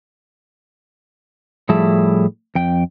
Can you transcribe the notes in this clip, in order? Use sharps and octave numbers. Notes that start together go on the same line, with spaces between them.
A2 F3 G3 E4 G#4 A5
F2 G5